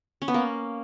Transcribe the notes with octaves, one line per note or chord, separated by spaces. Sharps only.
C#4
B3
A#3